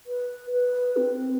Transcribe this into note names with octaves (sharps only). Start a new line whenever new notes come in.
B4
B4
C4